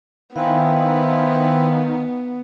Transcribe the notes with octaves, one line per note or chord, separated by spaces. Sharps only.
D#3 B3 C4 E4 B4 F5 G#5